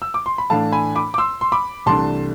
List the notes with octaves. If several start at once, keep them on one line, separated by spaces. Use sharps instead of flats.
E6
D6
C6
B5
A2 E3 A3 D4 F5 A5
G#5 B5
B5 D6
D6
C6 E6
C6
B5 D6
C2 C3 E3 A3 D4 A5 C6